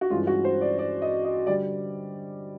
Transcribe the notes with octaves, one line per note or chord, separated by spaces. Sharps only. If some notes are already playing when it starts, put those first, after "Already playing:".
F#4
G2 E3 G#3 C#4 F4
F#4
C5
D5
D5
D#5
D#5
D3 G3 D5